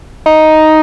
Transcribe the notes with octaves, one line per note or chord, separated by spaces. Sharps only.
D#4